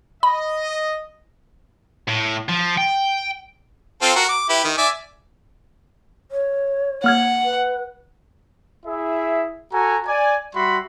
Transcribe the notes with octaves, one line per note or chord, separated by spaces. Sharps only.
D#5 B5
A2
F3
G5
C4 F4 A4
F#4 A#4
D6
E4 G4 B4
D#3
D5 E5 G#5
C#5
A#3 F#5 F6 G#6
B4
E4 G#4 E5
F#4 A4 G#5 A#5
D5 G#5
G3 F#4 E5 B5 C6